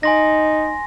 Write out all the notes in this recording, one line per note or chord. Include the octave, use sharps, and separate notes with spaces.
D#4 G#5 C6 A#6